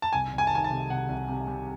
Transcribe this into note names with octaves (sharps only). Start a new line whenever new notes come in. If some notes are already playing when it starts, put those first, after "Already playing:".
A5
C2 G#5
C2
G#5
A5
D#3 G#5
A5
C3
C3 F#5
C2
C3
C3